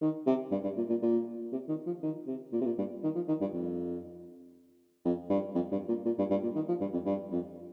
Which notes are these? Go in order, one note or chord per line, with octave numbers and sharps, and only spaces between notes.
D#3
C3
G2
G2
A#2
A#2
A#2
C3
D#3
F3
D#3
C3
A#2
C3
A#2
G2
D#3
F3
D#3
G2
F2
F2
G2
F2
G2
A#2
A#2
G2
G2
A#2
D#3
F3
G2
F2
G2
F2